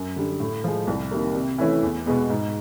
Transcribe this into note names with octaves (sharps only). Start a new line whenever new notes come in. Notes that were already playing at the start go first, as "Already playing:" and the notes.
Already playing: F#2
D3 G3
A2
F3 G#3
C2
C3 D#3 G3 A#3
C3
E3 A3 C#4 E4
E2
B2 G#3 B3
G#2